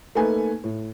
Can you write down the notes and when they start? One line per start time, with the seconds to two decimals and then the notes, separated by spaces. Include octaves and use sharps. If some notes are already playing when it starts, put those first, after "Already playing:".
0.15 A3 A#3 D#4 A4 B4 G#5
0.64 A2